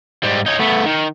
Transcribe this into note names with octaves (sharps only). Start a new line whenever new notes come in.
G#2 G3
D#4 C#5
A3 B3
D#3